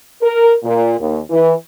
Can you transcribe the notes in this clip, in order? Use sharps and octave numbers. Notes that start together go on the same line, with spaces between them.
A#4
A#2
D#2
E3